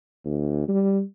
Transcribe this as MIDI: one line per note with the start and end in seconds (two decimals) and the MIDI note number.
0.25 0.64 38
0.68 1.01 55